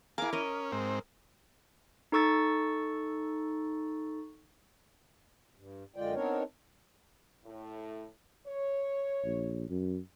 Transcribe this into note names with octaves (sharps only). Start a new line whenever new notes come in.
E4 G#4 A#4 F5 D6
C#4 A#4 D#5
G#2 C4
D#4 A4 C#6 E6 A6
G2
F#2 D3 G#3 F4 D5 G5
B3 C4 D4 D#4 A#4 C#5
A2
C#5
A#1
F#2